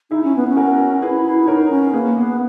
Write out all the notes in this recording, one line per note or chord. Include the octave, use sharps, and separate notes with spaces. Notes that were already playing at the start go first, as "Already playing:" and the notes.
D#4 E4 G#4
C#4
B3
C#4
F#4 A#4
E4 G#4 B4
E4
E4
D#4 A#4 C#5
C#4
A#3 G#4 B4
B3